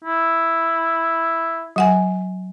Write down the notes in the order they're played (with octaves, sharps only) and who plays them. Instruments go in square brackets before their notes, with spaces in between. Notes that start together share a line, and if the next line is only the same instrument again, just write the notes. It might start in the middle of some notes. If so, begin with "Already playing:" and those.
[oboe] E4
[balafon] F#3 F#5 G#5